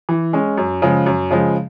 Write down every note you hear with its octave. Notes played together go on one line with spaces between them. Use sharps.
E3
G#3 C#4
F#2
C#3 F3 G#3
F#2
C#3 F3 G#3